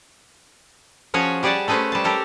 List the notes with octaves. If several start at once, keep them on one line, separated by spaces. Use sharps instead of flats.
F3 C#4 F#4 G#4 C#5
G3 G4 G#4 D5 F#5 A5
A3 C#4 G#4 B4 C5
G3 A5
G4 A4 A#4